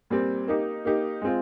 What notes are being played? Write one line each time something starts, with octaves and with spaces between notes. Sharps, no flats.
A#2 G3 C4
A#3 D#4 G4
A#3 D#4 G4
G#3 C4 F4